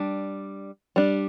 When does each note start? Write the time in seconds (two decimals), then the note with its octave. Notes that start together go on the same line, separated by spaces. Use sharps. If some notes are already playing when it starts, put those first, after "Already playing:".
Already playing: G3 D4
0.96 G3 D4